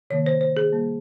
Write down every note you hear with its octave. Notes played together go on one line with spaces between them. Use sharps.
C3 D#3 A#3 C#5
C5
C5
G#4
G3 A#3